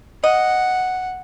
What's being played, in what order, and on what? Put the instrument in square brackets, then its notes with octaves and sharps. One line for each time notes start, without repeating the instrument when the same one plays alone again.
[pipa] D#5 [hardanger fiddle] F#5